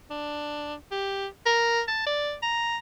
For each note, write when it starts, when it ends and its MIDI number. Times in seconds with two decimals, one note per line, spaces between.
0.10 0.75 62
0.91 1.27 67
1.46 1.81 70
1.88 2.02 81
2.07 2.35 74
2.43 2.77 82